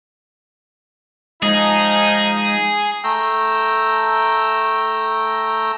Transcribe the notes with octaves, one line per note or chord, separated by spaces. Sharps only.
F3 G#3 D#4 G#4
A3 G5 A#5 E6